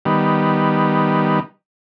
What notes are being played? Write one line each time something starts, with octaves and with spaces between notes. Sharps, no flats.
D#3 G3 B3